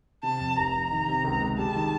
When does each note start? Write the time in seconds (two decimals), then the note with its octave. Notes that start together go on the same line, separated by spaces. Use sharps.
0.23 C3 A5
0.40 F2
0.57 F1 A#5
0.75 F1
0.91 D#3
1.08 C3
1.25 C#2
1.41 G#3
1.58 G3 A5
1.76 D#3